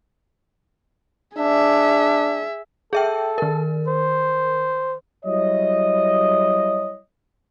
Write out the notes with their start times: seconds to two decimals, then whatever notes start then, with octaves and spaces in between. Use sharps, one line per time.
1.37 D4 G#4 E5
2.93 G#4 A4 E5 G5
3.38 D#3 A#4
3.88 C5
5.25 F#3 G3 E4 C#5 D#5